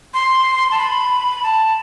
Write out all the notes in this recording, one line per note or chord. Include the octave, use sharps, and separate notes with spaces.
C6
A5
B5
A5